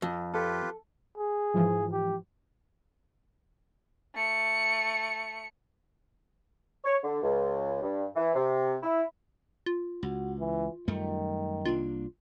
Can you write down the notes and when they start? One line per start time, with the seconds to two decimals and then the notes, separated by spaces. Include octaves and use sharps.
0.02 F2
0.34 F4 G4 A4 B4
1.17 G#4
1.54 G#2 E3 F3
1.93 G4
4.15 A3 C#7
6.84 C#5
7.04 D3
7.22 C#2
7.82 G2
8.16 E3
8.34 C3
8.83 E4
9.66 F4
10.03 C#2 F#4
10.39 E3
10.88 F#2 D#3 G3 A3
11.65 C2 A#3 D4 F4